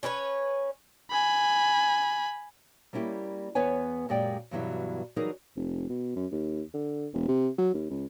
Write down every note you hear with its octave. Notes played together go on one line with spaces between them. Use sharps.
C#4 D4 B4 C#5
G#5 B5
G3 A#3 C#4 E4 G4
E2 B3 B4 C#5 G#5
F#2 A#2 G#3 G4 D5 G5
G2 B2 E3 F#3 G3 E4
E3 F#3 G3 D#4 G#4 A#4
F1
B2
F#2
D#2
D3
E1
C3
F#3
D#2
C#2